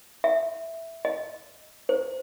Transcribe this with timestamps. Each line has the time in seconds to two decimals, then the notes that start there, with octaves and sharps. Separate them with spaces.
0.24 E5
1.05 D#5
1.89 C5